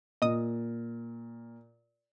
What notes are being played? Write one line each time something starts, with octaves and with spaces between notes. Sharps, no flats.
A#2 D#5 D#6